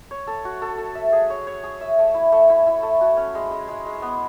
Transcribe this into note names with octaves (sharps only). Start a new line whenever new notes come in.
C#5
A4
F#4
A4
A4
E5
G#4
C#5
C#5
G#4
E5
A3
E4
A3
E4
E4
A3
F#4
C#4
G#3
G#3
G#3
G#3
B3